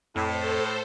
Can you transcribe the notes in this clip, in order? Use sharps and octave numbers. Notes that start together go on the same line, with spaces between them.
F2 A2 A4 C5